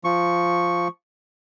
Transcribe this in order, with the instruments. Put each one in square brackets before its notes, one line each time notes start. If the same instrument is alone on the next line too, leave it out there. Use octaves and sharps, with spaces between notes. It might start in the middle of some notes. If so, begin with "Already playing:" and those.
[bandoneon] F3 C#6